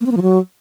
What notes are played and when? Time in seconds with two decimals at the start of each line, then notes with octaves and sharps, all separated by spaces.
0.01 A#3
0.06 C4
0.11 A#3
0.17 F3
0.22 F#3